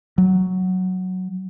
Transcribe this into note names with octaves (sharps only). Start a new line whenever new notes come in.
F#3